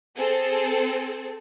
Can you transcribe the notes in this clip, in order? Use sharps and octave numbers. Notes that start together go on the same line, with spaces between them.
C4 G#4 A4